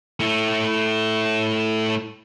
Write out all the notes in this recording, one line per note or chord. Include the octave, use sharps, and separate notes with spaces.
A3 E4